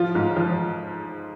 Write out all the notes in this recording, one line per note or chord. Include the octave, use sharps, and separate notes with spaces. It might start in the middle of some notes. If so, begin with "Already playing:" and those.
Already playing: F3 F4
G#2
F3